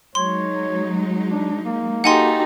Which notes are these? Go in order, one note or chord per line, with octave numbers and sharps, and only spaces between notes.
F#3 G#3 D#4 C#5 C6
D4
A#3
D#4 F#4 G4 A4 F#5 G#5 C6